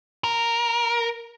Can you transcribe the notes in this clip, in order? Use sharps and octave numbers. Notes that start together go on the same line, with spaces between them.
A#4